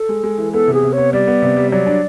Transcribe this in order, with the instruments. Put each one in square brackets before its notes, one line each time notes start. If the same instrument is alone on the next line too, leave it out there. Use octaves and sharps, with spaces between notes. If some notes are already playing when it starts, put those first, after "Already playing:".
Already playing: [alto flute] A4
[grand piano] G#3
G#3
E3
[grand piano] B3 [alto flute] A4
[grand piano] C3
[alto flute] G#4
[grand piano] C3
[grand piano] B3 [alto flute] C#5
[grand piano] G3 [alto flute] D5
[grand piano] B3
C3
G3
[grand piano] F#3 [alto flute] D5
[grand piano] D4